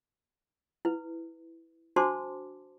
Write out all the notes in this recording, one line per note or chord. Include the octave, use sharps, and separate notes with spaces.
E4 B4
D4 F#4 C5 A5 C6 D6